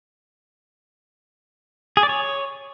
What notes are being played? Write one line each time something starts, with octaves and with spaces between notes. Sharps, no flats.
G#4
D5
C#5